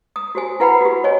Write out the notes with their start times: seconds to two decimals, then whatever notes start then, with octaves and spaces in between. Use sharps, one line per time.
0.16 D#6
0.35 F#4 G4 C5 G#5
0.60 E4 B4 F#5 G5 B5
0.81 F#4 G4
1.04 C5 C#5 D#5 G#5